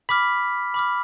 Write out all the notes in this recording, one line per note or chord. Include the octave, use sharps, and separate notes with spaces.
B5 D6 F6 B6
B5 D6 F6